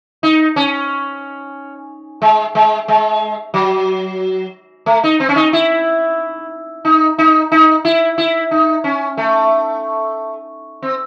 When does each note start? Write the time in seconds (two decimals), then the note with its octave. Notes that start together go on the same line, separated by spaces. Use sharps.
0.23 D#4
0.56 C#4
2.22 G#3
2.55 G#3
2.88 G#3
3.54 F#3
4.86 A3
5.04 D#4
5.20 C4
5.29 C#4
5.36 D#4
5.53 E4
6.85 D#4
7.18 D#4
7.52 D#4
7.85 E4
8.18 E4
8.51 D#4
8.84 C#4
9.17 A3
10.82 C4